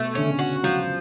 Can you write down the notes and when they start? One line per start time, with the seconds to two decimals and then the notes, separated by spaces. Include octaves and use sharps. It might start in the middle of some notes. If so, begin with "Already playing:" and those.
Already playing: B2 A3
0.15 D3 C#4
0.27 C#3
0.39 F#4
0.63 F3 F#3